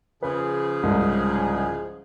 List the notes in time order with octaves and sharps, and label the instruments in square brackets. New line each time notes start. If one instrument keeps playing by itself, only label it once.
[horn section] C#3 F3 G#4 [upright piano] B4
[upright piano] C2 G#2